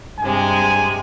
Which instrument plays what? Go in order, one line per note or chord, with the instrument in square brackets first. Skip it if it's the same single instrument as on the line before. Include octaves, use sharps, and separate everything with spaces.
[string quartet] G2 C3 G#3 [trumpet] G#5